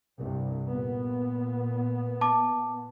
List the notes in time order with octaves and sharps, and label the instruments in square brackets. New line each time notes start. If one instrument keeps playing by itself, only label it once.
[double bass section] C2 G2
A#2 B3
[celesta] A5 D6